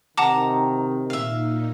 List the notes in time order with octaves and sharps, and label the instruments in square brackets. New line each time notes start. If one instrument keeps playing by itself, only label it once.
[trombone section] C3 D#3 [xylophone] F#5 A5 D6 [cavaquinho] A#5
[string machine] A#2 D#4 [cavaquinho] E5 F5